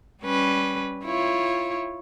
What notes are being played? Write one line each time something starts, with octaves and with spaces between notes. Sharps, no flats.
G3 C#4 B4
E4 F4 C#5